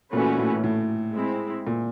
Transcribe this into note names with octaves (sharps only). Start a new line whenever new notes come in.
A#2 E3 A3 C#4 F#4 B4
A2
A2
G#3 C4 E4
A#2